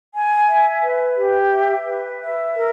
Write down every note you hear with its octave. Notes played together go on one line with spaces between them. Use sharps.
G#5
E5
B4
G4
E5
B4
E5
A#4